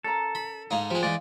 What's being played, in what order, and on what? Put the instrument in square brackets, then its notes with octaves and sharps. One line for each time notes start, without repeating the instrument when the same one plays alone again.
[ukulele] C#4 A#4 A#5 [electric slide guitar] A4
[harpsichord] B5
[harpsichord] G#2 D#4 [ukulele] F5
[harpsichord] F3 G#3 [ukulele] G4
[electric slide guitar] E3 D5 [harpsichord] G#3 [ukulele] F5